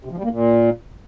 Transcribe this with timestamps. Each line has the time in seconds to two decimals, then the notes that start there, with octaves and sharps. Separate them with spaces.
0.05 C3
0.11 F3
0.18 G3
0.24 A#3
0.31 A#2